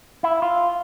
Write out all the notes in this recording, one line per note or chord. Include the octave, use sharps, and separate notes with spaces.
E4
F4